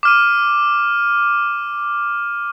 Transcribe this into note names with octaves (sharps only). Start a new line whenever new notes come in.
D6 F6 D#7